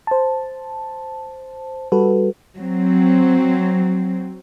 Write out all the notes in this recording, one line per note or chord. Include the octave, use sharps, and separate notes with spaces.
C5 A5
G3 F#4 A4 B4
F#3 C4